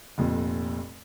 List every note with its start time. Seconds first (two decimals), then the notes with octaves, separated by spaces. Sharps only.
0.18 F1 F2 A#2